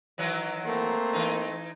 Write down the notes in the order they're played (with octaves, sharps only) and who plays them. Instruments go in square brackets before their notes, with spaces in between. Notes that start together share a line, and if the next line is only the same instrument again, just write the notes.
[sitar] D#3 E3 F#3
[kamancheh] A3 C4 [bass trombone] A#3
[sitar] E3 D#4